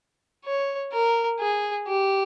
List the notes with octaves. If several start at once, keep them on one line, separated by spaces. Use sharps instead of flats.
C#5
A#4
G#4
G4